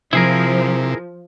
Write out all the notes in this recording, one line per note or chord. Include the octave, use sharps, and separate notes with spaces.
C3 F3 E4 G#4 A#4